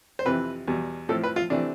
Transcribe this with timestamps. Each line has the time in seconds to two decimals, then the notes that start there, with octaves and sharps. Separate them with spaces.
0.19 C5
0.26 F2 C3 E3 B4
0.68 E2 B2 G3
1.09 A2 F3 C4 A4
1.24 B4
1.36 F4
1.50 C3 E3 A3 C4 D4